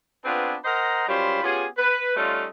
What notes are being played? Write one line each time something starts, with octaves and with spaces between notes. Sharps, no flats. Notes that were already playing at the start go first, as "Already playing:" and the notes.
B3 C4 D4 F4 G#4 B4
A#4 C5 D#5 F#5 A#5
F#2 G3 C#4 F4 C5 B5
B3 C#4 F4 G4 G#4
B4
G3 A3 C#4 D#4 F4